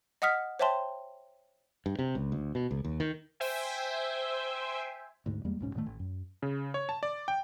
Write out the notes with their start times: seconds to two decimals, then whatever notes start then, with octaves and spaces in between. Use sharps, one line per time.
0.22 D#5 F#5 D#6 F6 B6
0.59 C5 C#5 E5 G5 A5 C6
1.86 G2
1.99 C3
2.15 C#2
2.32 D2
2.55 B2
2.71 C#2
2.85 D#2
3.00 D#3
3.40 C5 E5 G5 G#5
5.26 D2 G#2
5.44 E2 G3 G#3 A#3
5.59 D#1 B1 G#2 C#4
5.74 D#1 A2 D#3 A3
5.86 A1
5.99 F#2
6.42 C#3
6.74 C#5
6.89 A5
7.03 D5
7.28 G5